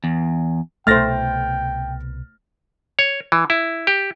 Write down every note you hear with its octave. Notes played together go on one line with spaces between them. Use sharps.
E2
C2 B2 A3 C5 G5 F6 A6 A#6
C#5
E3
E4
G4